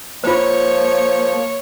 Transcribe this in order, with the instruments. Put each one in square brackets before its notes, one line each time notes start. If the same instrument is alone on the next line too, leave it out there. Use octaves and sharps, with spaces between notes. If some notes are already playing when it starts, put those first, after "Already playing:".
[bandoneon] F3 [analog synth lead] A#3 [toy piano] F4 C5 [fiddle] C#5